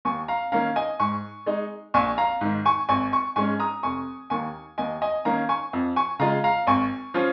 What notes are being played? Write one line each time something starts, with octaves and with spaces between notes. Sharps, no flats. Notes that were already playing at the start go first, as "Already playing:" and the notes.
D#2 G#5 C#6
F5 A#5
D#3 A#3 C#4 F5 A#5
D#5 G#5
G#2 G#5 C#6
G#3 D#4
A#1 G#5 C#6
F5 A#5
G#2 D#3
G#5 C#6
G#1 G#5 C#6
G#5 C#6
G#2 G#3 C#4 G#5 C#6
A#5 D#6
F1 G#5 C#6
D#2 D#3 A#3 G#5 C#6
D#2 D#5 G#5
D#5 G#5
D#3 A#3 C#4 F5 A#5
G#5 C#6
F2
G#5 C#6
C#3 G#3 F4 F5 A#5
F5 A#5
G#1 G#5 C#6
F3 C#4 F4